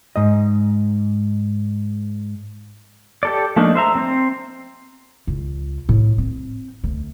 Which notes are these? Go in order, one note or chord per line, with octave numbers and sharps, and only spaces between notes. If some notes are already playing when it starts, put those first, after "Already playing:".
G#2 D#5
G4 A4 D5
F3 A3 A#3 D4 D#4
C5 E5 A#5
C4 C5
C#2
A2
C4
D2